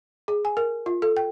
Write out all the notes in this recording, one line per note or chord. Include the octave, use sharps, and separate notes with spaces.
G#4
G#5
A#4
F4
A4
G5